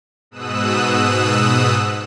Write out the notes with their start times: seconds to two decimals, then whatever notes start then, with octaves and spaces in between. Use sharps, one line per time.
0.31 G#2 B2 D#6 E6 F#6